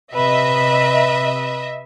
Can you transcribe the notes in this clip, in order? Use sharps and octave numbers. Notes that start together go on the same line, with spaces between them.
C3 B4 D#5 E5